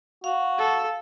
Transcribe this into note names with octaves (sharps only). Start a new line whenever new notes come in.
F#4 F5
A4